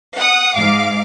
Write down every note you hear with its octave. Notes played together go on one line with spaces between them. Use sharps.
F#5 D#6
G#2 F5 D6